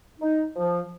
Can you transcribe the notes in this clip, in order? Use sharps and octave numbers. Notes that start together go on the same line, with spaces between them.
D#4
F3